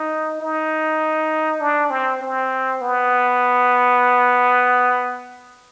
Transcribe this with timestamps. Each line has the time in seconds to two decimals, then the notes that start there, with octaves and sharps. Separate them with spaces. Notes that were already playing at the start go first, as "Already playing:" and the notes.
Already playing: D#4
0.41 D#4
1.61 D4
1.91 C4
2.21 C4
2.82 B3